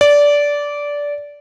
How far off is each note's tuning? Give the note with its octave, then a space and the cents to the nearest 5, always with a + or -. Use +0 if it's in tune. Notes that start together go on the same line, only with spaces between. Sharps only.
D5 -15